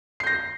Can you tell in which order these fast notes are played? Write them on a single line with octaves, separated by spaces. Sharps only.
C7 G6 A#6